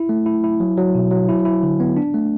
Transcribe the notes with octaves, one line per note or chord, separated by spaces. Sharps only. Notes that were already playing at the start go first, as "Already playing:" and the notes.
Already playing: E4
A3
E4
E4
F#3
F#3
B2
F#3
E4
E4
D3
B3
D4
A3